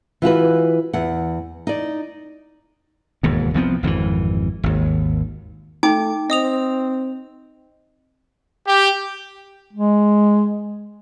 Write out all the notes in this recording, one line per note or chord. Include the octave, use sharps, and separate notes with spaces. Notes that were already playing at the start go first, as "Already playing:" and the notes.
E3 F4 F#4 B4
E2 F#5
D#4 D5
E1 D#2 G#2
C2 F3 B3 C4
G#1 F2 C#3 E3
G#1 D#2
A3 D#4 G5 D6
C4 D#5 D#6 F7
G4
G#3